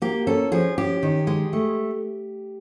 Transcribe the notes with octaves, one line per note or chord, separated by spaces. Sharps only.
A#3 G4
C#4 A4
F3 G#4
C#4 G4
D#3
G#3
A3